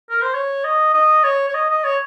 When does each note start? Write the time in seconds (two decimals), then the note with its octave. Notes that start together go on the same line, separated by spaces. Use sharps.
0.10 A#4
0.22 C5
0.34 C#5
0.64 D#5
0.94 D#5
1.24 C#5
1.49 C#5
1.54 D#5
1.70 D#5
1.84 C#5